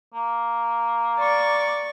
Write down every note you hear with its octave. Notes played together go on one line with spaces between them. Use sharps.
A#3
D5 C#6